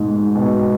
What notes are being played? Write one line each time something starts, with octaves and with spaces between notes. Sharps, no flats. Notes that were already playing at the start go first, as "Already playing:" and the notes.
Already playing: G#2 B2
B2